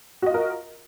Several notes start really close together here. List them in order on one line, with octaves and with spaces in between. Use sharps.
F#4 D#5 F4 A#4